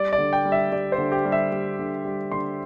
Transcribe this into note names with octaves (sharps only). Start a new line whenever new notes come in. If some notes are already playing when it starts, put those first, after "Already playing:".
Already playing: G3 D5
D5
D3
G5
G3
E5
G3 D5
C5
D3
G4
G3
E5
G3
D3
G3
D3 C6